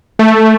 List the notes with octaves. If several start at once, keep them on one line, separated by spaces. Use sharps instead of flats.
A3